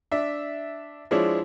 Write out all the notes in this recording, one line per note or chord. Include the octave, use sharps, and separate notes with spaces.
D4 E5
F3 G#3 D4 E4 C#5